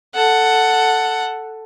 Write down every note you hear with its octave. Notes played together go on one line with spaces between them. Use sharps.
A4 F#5